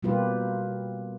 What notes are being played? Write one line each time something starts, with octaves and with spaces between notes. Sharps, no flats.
B2 G3 A#3 F4 G4 B4